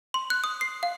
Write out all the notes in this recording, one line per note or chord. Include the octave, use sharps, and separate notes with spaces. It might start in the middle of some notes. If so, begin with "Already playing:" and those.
C6
F#6
D#6
C7
F5